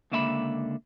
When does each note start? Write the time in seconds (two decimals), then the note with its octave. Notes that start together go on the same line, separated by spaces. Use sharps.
0.12 C#2 D3 A#3 E5 A5 B5